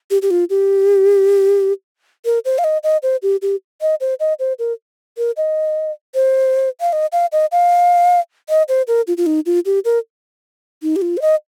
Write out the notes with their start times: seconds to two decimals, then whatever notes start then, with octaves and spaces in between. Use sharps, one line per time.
0.11 G4
0.22 G4
0.31 F4
0.50 G4
2.25 A#4
2.45 C5
2.58 F5
2.64 D#5
2.84 D#5
3.03 C5
3.23 G4
3.42 G4
3.81 D#5
4.01 C5
4.20 D#5
4.39 C5
4.59 A#4
5.18 A#4
5.37 D#5
6.15 C5
6.81 F5
6.93 D#5
7.12 F5
7.32 D#5
7.52 F5
8.49 D#5
8.68 C5
8.88 A#4
9.07 F4
9.17 F4
9.26 D#4
9.46 F4
9.66 G4
9.85 A#4
10.83 D#4
10.96 G4
11.02 F4
11.17 C5
11.21 D#5